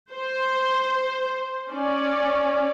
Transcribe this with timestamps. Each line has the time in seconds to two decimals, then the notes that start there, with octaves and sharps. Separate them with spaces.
0.11 C5
1.71 C#4 D5